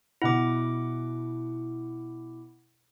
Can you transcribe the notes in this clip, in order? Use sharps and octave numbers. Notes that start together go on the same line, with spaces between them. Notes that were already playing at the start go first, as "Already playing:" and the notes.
B2 E4 F#5 D6